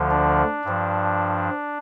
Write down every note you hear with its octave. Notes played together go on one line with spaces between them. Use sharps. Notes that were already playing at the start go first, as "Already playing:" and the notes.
Already playing: D2 D3 F3
D4
G2 F3